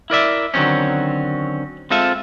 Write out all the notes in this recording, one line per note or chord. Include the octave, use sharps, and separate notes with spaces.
E4 A#4 D5 E5
D3 D#3 F#3 C4 C#4
G#3 C4 F4 A4 E5